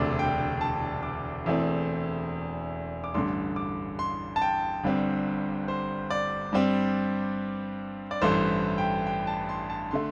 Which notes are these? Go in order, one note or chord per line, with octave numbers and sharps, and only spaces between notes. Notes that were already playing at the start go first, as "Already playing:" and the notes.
Already playing: E1 D2 C3 D5
G5
A5
D6
E1 E2 E3 A3 C4
D6
A1 G2 D3 C6
D6
C6
A5
G5
G1 G2 G3 C4
C5
D5
G2 G3 C4
D5
A1 G2 E3 A3 C5
G5
G5
A5
C6
A5
D3 A3 C6